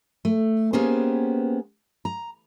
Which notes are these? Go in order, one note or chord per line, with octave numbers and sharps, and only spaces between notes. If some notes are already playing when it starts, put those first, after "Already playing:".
A3
A#3 B3 C#4 G4 G#4 C5
A#5